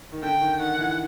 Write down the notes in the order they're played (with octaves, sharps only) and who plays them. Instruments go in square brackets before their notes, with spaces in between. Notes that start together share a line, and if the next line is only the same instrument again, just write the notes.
[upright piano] D#3
[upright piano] D3 [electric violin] G5
[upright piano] D#3
[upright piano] D#3 [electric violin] F#5
[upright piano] E3